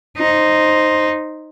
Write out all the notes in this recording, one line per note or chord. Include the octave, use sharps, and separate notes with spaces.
D#4 C5